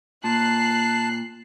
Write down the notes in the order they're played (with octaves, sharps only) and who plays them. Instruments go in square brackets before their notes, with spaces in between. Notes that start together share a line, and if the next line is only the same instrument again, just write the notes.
[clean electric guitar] A#2 [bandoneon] A5 [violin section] F#6 C7